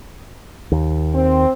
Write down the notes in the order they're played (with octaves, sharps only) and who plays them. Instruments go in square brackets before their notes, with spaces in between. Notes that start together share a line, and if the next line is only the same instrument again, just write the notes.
[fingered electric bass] D#2
[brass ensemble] C4